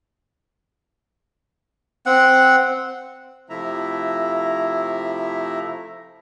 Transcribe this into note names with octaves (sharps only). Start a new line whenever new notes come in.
C4 F#5
C3 F3 A3 E4 E5 A#5